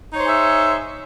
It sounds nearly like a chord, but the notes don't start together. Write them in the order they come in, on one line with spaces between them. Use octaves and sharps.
D#4 C#5 C5 G#4 E5